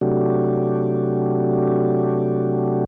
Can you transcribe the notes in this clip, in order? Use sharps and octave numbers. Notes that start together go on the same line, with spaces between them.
C3 F#3 A3 D4 F#4 G4